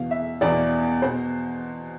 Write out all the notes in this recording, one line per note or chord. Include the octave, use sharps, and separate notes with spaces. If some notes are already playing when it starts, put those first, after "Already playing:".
Already playing: E2 B2 F5
E5
E2 B2 D5
B2 C5